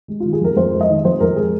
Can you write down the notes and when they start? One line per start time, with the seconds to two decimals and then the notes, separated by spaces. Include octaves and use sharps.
0.08 G#3
0.20 D#3 F4
0.33 G#4
0.41 F2 A#4
0.56 F2 C5
0.73 G#3
0.81 D#5
0.89 D#3
1.05 F2 C5
1.20 F2 A#4
1.36 G#3 G#4